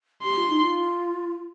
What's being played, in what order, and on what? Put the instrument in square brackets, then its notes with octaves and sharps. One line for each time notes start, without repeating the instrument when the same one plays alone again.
[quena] G4 [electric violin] C6
[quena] F4
D#4
F4